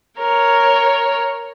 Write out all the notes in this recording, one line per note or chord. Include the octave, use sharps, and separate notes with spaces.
A#4 C#5